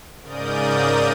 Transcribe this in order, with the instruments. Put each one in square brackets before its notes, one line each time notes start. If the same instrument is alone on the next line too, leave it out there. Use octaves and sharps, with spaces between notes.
[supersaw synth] G#2 C#3 A#4 D5 D#6 G6